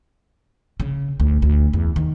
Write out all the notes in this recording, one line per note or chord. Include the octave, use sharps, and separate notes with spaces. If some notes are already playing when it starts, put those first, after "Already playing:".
C#3
D2
D2
E2
D#3